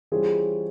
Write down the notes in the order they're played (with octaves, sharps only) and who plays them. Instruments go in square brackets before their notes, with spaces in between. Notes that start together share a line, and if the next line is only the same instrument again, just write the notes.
[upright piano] E3 G3 C#4 F4 C5 [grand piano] G#4